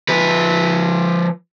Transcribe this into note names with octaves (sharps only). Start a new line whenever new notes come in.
F3 B4